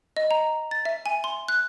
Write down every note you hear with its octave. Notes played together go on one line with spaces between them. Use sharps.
D#5
A#5
A6
E5
G#5
C6
F#6